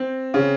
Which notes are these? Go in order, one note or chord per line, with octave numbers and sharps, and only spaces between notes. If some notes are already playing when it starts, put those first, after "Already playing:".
Already playing: C4
C#3